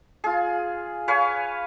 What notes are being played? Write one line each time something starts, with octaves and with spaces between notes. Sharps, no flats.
F4 G#4
B4 C#5 F5 G#5